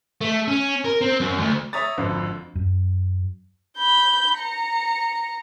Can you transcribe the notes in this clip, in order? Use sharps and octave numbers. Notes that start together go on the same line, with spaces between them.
A3
C#4
A#4
C4
F#2
D2
C#5 E5 A#5 D#6 A6
G#1 F2 D3
F#2
B5 G6
A#5 C#7